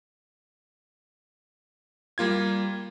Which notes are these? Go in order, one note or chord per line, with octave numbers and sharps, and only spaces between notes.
G3 A#3 F4 G#6